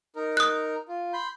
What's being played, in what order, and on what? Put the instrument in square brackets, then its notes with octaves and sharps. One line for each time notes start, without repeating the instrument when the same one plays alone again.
[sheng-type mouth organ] D#4 A#4
[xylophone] D#6 F#6
[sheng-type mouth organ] F4
B5 C6 G6